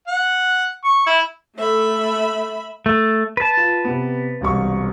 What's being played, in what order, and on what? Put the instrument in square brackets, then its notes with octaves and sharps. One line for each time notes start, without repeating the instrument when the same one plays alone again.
[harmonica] F#5
C#6
E4
[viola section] A3 [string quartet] E5 B5
[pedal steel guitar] A3
B4 A5
[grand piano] F4
C3 B3
E1 C2 C#6